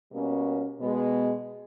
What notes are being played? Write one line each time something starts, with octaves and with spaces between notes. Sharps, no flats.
B2 G3 A#3 C#4
B2 G#3 B3